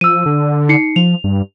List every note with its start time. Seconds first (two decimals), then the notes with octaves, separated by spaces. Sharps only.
0.01 F3 E6 D#7
0.26 D3
0.69 D#4 C7 C#7
0.96 F3 F7
1.24 G2